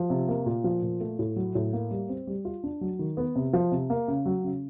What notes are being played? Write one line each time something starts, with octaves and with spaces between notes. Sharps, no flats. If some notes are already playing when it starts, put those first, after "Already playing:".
Already playing: F3
C3
A#3
A#2
F3
A#2
A3
A2
F#3
A2
A#3
G3
C4
G3
F4
D4
F#3
D#3
B3
C3
F3
C3
A#3
C#3
F#3
C#3